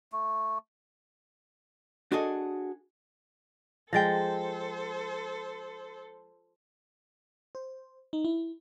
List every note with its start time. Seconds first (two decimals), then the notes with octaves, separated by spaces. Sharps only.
0.12 A3
2.12 D4 F#4 G#4 A4 D#5
3.93 F3 G#3 A4 C5 G5 A6 A#6
7.55 C5
8.13 D#4
8.25 E4